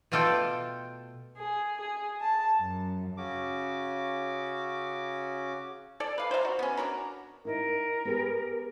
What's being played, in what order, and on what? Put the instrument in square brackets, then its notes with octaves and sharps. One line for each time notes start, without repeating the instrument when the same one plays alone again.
[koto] B2 A3 F4 A4 D5 G5
[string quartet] G#4
G#4
A5
F#2
[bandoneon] C#3 C#4 F#4 D6
[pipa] A4 D5
B4 F5
C5 D5 F5 A#5
F#4
B3 C#4
D4 F#4 A#4 A#5
[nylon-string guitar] D#4 E4 D#5 [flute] A#4
[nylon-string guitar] B3 G4 G#4